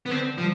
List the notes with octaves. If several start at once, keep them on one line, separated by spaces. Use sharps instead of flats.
B3
D3 C4
F3 G3